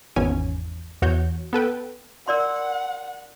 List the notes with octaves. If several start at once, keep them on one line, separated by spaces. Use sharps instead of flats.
G#1 E2 C#4 G#5
E2 F#4 C#5 G6
B3 A4 B4 G5
A#4 D5 F#5 C6